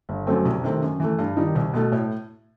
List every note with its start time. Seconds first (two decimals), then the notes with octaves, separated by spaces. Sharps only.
0.09 G1
0.27 F#2 F#3 A3 C4
0.45 C2
0.64 C3 D#3 A3 C4
0.82 F#2
1.00 E3 A3
1.19 G2
1.37 D#3 G3 D#4
1.55 C2
1.74 B2 A3
1.92 A2